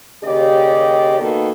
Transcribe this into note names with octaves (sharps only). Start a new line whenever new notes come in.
D#2 C#3 G4 D5 D#5
D#3 A#3 B3 D#4 F#4 A4